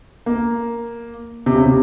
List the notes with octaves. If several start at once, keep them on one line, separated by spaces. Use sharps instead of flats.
A#3
C3
C#3
C3